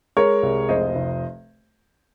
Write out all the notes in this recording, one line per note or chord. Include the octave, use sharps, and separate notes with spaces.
G#3 A#4 C#5
C2
F1 C5 D#5
F1